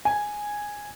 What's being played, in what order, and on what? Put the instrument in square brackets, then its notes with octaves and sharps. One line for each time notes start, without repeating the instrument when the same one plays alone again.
[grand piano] G#5